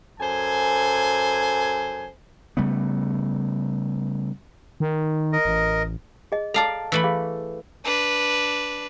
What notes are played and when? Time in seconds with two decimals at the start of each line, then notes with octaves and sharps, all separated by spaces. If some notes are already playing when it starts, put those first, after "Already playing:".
0.21 F#2 A4 C5 G#5
2.57 C#3 G3 A3 B3
4.80 D#3
5.33 A#4 D#5
5.45 A1
6.32 G#4 D#5
6.54 A4 D5 F5 A5 A#5 E6
6.92 E3 A3 B5
7.04 G#4 F5
7.85 D4 B4